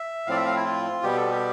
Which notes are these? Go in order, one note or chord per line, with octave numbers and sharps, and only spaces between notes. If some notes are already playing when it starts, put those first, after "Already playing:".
Already playing: E5
A2 F3 C4 D5 F5
E5
F5
E4
F4
B2 G3 B3 G4
A4
G4